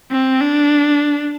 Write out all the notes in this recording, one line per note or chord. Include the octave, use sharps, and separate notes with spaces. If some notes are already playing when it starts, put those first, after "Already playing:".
C4
D4